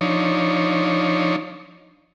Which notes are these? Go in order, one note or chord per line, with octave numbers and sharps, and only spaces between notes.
F3 D4 D#4 C#5